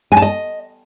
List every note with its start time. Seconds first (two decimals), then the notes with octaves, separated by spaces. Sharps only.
0.12 G#5
0.17 A5
0.22 D#5